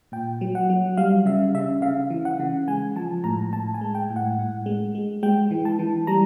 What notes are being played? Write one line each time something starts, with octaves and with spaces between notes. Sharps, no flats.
A#2 G5
F#3
F#5
F#3
G3 F5
C#3 E5
C#3 E5
C#3 F5
E3
F#5
C#3
G#3 G#5
F3 A5
A2 A#5
A2 A5
G#5
G#3
G5
A2
F#5
A2
G#3
G#3
G#3 G5
E3
A5
E3
G3 A#5